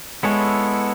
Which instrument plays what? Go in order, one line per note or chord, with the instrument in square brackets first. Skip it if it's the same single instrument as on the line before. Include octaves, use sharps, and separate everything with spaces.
[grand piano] G#3 [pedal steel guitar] B3 E4 A4 C#5